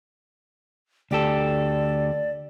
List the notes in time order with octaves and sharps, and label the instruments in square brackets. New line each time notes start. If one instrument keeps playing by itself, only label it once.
[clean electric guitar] D2 G4 A4 [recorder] D5